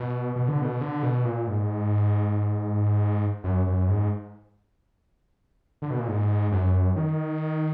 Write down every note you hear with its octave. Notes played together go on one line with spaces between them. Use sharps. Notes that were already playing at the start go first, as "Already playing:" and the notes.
Already playing: B2
B2
D3
B2
D3
B2
A#2
G#2
F#2
F#2
G#2
D3
B2
A#2
G#2
F#2
D#3